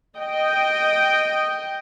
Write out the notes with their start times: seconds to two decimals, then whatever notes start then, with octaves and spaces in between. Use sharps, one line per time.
0.19 D#5 G5